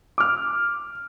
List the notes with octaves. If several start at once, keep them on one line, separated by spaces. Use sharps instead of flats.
D6 F6